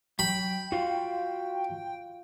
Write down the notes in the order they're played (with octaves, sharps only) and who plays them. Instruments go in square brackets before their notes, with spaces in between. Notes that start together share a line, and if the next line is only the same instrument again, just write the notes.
[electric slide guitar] F#3 [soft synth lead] G5 [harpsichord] B5
[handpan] F4 [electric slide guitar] F#4 F5